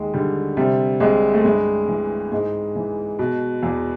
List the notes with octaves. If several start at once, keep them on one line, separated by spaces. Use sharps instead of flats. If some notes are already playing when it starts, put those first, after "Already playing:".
Already playing: D#2 G#3
D3 G3
C3 G3
C2 G#3
A3
G2 G#3
E3
G#2 G#3
E3
B2
E2